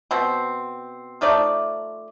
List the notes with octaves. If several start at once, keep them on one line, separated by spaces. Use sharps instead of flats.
B2 C4
F3 A3 D#4 D5